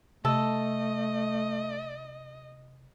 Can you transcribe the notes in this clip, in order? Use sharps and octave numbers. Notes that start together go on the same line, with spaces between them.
C3 A3 A4 D#5